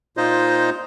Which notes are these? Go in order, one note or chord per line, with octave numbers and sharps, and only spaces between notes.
A#2 D#4 F4 C5 D#5